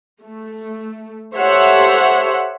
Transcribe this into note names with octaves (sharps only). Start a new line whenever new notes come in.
A3
G4 A4 C5 C#5 E5 F#5